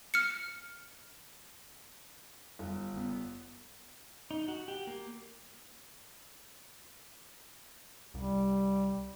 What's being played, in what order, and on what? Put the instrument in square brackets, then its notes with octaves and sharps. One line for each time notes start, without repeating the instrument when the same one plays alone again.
[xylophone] F6 C#7
[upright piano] G1
[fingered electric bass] F#1 B3
[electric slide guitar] D#4
F#4
G4
A#3
[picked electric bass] C2 [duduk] G3